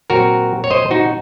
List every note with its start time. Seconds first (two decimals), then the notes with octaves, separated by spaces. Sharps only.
0.10 A#2 F#3 C4 F#4 A#4
0.64 C#5
0.71 C5 D#5
0.91 D#4 F#4